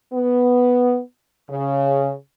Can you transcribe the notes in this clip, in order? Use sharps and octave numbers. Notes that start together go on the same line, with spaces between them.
B3
C#3